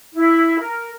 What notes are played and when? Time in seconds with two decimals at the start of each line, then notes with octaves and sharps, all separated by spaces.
0.14 E4
0.60 A#4